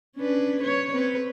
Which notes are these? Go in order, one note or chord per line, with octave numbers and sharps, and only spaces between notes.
C#4 D4 B4
B4 C#5
C4 B4